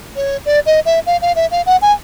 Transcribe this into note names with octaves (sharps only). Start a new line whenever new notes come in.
C#5
D5
D#5
E5
F5
F5
E5
F5
F#5
G#5